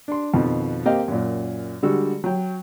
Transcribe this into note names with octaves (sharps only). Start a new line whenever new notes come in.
D4 C6
F2 B2 D#3 F3
A#3 C4 G4 D#5 F5 G5
F#2 A#2
D3 G3 G#3 F#4 E6
F#3 G5